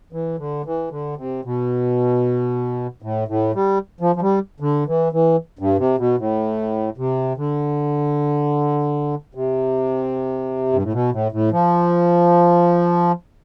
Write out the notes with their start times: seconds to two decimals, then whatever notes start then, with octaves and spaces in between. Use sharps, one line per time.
0.13 E3
0.38 D3
0.65 E3
0.91 D3
1.17 C3
1.45 B2
3.02 A2
3.28 A2
3.55 G3
4.00 F3
4.16 F3
4.21 G3
4.60 D3
4.87 E3
5.13 E3
5.59 G2
5.78 C3
5.98 B2
6.18 A2
6.97 C3
7.37 D3
9.35 C3
10.73 G2
10.82 A2
10.92 B2
11.12 A2
11.32 A2
11.52 F3